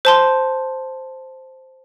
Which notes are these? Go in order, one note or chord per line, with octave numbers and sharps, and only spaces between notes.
C5 A5 C6